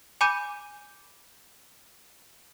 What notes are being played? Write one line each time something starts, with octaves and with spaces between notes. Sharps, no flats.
G#5 B5 D6 G6 D#7